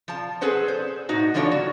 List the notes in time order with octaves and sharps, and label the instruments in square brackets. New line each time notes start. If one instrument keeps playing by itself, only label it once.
[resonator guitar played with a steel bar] F3 A5
G#4 A4 B4 C5 F#5
C5
A2 D#4 F#4
D3 E3 F3 D4 C#5 F#5
F#4